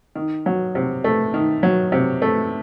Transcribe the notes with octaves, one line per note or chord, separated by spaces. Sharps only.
D#3
F#3
C3
A3
D#3
F#3
C3
A3